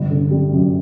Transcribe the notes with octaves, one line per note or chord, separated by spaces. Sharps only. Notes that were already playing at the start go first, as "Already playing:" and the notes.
Already playing: G1
D3
G3
F#2